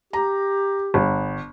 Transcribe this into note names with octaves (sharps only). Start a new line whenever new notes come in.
G4 A#5
G1